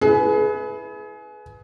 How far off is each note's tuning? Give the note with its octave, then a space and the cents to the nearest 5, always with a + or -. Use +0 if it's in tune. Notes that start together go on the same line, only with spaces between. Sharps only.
E4 -5 G#4 +30 B4 +0